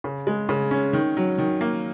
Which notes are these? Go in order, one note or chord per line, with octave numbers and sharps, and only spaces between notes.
C#3
G#3
C#3
C#4
D#3
F#3
D#3
A#3